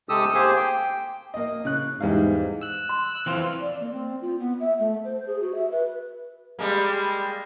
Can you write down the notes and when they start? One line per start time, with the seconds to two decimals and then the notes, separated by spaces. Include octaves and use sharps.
0.09 C3 G#3 G4 A4 D#6 E6
0.34 A#3 G4 G#4 C5 G#5
0.57 G5
1.34 A#3 D#5
1.65 C#3 F#6
2.00 E2 G#2 G3 F5
2.61 E6 F#6
2.89 C6
3.26 E3 C4 F4
3.61 D5
3.81 A#3
3.92 C4
4.22 F4
4.39 B3
4.60 E5
4.79 A3
5.04 C5
5.27 G#4
5.40 F#4
5.55 E5
5.71 B4
6.59 G3 G#3 A#3